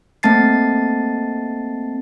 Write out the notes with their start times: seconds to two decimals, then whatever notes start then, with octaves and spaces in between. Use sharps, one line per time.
0.23 A3 A#3 C4 A5 A6 C7